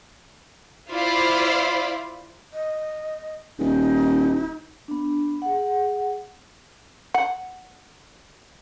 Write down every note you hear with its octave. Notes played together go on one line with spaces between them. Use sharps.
E4 F4 C5 D5 F5 B5
D#5
D#1 D#4
B3 D4
G#4 F#5
F#5